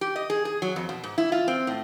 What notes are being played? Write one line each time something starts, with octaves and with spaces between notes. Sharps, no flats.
G4
D#5
G#4
G#4
F#3
F2
B2
G#2
E4
F4
C4
A2